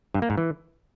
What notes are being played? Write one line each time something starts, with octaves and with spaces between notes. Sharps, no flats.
G2
A#3
G#2
E3